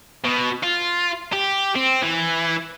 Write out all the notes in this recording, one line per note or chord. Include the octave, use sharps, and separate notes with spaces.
B2
F4
G4
C4
E3